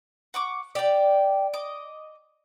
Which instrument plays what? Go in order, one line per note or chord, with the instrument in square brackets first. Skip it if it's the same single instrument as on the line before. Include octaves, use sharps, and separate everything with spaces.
[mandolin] F#5 C#6 D6
[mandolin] G4 G5 [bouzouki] D5
[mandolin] D#5 D6